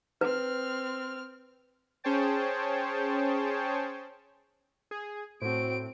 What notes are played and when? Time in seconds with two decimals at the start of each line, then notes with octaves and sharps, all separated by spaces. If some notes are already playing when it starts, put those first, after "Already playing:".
0.21 C4 B4 F6
2.04 C#4 G#4 C5 C#5 G5 A5
4.91 G#4
5.42 A2 C4 F#4 C5 D7